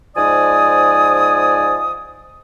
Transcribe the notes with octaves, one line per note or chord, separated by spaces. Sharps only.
G#2 F3 D5 G#5 D#6